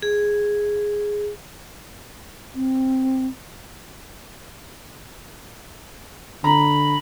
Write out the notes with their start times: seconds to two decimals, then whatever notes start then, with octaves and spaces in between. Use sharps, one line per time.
0.02 G#4
2.54 C4
6.44 D3 A#5 B5